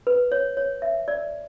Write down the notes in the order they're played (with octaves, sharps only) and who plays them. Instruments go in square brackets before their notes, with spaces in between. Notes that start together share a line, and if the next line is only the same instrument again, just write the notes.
[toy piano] B4
C#5
C#5
E5
D5